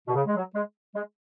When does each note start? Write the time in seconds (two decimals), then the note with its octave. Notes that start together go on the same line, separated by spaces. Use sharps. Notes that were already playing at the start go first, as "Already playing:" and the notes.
0.08 B2
0.14 C#3
0.26 G#3
0.35 F#3
0.54 G#3
0.94 G#3